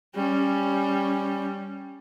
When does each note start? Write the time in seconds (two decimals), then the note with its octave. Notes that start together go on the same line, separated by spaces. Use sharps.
0.15 G3 C#4